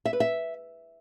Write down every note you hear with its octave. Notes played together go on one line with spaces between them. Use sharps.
E5
B4
E5